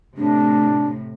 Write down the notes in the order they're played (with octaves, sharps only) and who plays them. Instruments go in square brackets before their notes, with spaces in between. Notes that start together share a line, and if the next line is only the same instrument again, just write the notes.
[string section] A2 C3 [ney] D4